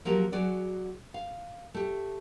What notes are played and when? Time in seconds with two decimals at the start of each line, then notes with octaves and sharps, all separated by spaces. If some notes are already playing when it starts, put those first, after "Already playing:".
0.05 F3 F#3 A#3 G4 A#4
0.32 F#3 F#4 G#4 D5
1.14 F5
1.74 A3 G4